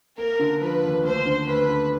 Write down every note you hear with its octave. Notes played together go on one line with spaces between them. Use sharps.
A#3 A#4
D3
F3 B4
D#2
D2 C5
D3
D2 B4
D3